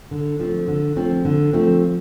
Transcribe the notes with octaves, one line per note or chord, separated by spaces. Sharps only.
D3
F3 A3 C4
D3
F3 A3 C4
D3
F3 A3 C4